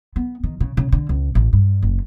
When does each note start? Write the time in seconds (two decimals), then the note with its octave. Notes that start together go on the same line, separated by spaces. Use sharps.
0.16 B3
0.44 D#3
0.60 C#3
0.77 C#3
0.92 D3
1.09 C#2
1.35 A1
1.53 G2
1.82 F#1